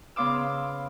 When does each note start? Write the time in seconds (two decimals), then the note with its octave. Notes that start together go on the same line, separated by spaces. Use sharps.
0.16 C#3 B3 F5 C6 D6 E6